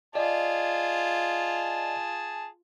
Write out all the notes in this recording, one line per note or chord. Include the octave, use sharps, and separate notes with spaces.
F4 G#4 D5 D#5 A5